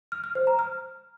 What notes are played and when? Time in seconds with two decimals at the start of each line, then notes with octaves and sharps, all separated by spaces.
0.12 F6
0.24 F6
0.35 C5
0.47 A#5
0.59 F6